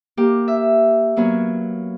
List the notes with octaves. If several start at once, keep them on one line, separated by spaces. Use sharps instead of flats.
A#3 G4
E5
F#3 A#3 B3 C#4 F#4